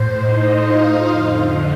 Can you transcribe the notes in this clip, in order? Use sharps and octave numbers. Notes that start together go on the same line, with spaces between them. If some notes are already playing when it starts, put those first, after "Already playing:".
Already playing: A2 C5
D#4 D#5
F4 F5
F2 D3